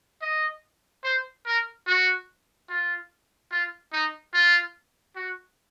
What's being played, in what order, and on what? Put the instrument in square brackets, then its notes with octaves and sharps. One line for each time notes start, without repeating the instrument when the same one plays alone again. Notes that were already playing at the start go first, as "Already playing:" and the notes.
[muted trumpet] D#5
C5
A#4
F#4
F4
F4
D#4
F4
F#4